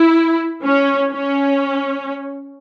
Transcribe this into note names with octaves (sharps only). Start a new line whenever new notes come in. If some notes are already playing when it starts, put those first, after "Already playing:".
Already playing: E4
C#4
C#4